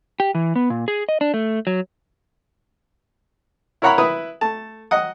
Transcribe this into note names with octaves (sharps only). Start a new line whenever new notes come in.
G4
E3
B3
A#2
G#4
D#5
D4
A3
F#3
E4 A#4 C#5 F#5 A#5 B5
E4 B4 D#6
A3 A5
D#5 F#5 D#6